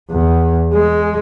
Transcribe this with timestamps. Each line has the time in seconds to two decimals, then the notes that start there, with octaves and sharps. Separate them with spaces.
0.11 E2
0.74 G#3